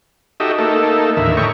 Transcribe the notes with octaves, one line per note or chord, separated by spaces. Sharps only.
D#4 F#4 G4 A4 D#5 E5
A3 A#3 D#4 A4
D#2 A2 D3 E3 A#4 E5
A4 C#5 D#5 G5 A#5 C#6